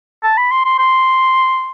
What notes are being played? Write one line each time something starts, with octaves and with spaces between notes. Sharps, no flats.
A5
B5
C6
C6
C6